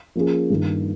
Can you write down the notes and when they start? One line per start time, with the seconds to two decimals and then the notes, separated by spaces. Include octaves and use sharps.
0.15 F3 A#3 C#4 G#4
0.50 G2 D#3 A#3